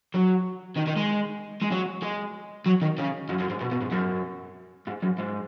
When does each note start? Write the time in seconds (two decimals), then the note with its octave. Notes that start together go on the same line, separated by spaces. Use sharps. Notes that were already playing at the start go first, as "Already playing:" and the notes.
0.14 F#3
0.77 D#3
0.88 D#3
0.97 G#3
1.62 G#3
1.71 F#3
2.02 G#3
2.66 F#3
2.82 D#3
2.98 C#3
3.29 F#2
3.40 F#2
3.50 G#2
3.61 B2
3.72 B2
3.82 G#2
3.92 F#2
4.87 G#2
5.02 F#2
5.18 G#2